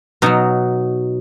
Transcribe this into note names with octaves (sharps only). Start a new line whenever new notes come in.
B2 F#3 D#4